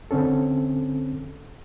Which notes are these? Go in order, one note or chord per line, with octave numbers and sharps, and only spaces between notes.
D3 C4 C#4 A4